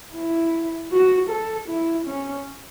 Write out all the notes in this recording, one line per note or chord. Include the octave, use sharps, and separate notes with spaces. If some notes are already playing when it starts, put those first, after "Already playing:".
E4
F#4
A4
E4
C#4